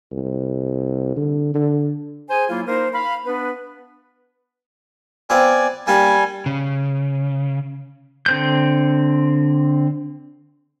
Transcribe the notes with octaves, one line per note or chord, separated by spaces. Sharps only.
C2
D3
D3
G#4 C5 G#5
F#3 A#3 E4 F4
A#3 D#4 A#4 C5
F5 B5
B3 D4 B4
B3 C4 F4 D5 G#5
G3 A#3 D4 G4 G#5
C#3
D3 C4 G6